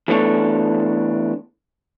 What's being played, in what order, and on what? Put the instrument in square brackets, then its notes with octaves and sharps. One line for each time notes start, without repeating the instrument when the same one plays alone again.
[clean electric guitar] E3 A3 B3 D4 A4 C#5